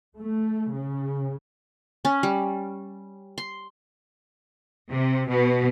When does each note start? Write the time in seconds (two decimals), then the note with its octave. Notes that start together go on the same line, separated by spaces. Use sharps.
0.17 A3
0.73 C#3
2.05 C#4
2.23 G3
3.38 C6
4.89 C3
5.27 B2